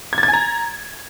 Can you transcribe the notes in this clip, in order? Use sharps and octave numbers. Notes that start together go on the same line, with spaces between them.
G#6
A6
G#6
G#5
A#5